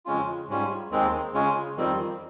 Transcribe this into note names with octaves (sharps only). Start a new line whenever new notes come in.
F2 C#3 G#3 C#4 F4
G#2 G3 C#4 F4
D#2 D#3 G#3 C4
C#3 G#3 C#4 F4
F2 D#3 G3 C4